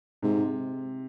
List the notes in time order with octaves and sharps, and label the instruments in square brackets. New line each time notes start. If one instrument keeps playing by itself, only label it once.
[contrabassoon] G#2 [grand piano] C3